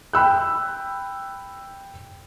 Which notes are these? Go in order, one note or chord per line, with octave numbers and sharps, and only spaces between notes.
G5 B5 E6 F#6